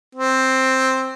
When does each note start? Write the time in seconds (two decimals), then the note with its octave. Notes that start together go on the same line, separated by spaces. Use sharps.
0.15 C4